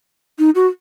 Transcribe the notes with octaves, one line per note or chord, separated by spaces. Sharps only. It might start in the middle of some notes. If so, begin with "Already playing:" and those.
D#4
F#4